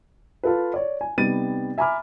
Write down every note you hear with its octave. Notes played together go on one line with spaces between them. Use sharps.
F4 A4 B4
C#5 D5
G#5
C3 G3 B3 D#4 A6 D#7
E5 G#5 A#5 B5 D6 F6